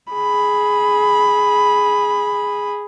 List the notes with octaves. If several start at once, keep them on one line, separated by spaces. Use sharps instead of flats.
G#4 B5